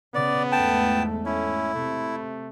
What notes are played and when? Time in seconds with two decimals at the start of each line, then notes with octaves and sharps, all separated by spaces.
0.15 C#3 B3 D5
0.52 E2 G#2 A3 G5 A5
1.26 C#4 E4
1.75 C3 A3